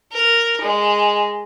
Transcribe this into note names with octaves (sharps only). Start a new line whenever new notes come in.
A#4
G#3